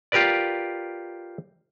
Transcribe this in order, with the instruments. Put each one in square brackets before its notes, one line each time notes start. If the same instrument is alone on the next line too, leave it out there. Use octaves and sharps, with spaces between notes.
[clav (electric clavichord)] F4 G4 A#4 B4 D5